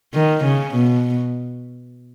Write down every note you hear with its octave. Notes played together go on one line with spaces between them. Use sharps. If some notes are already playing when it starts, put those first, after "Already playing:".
D#3
C#3
B2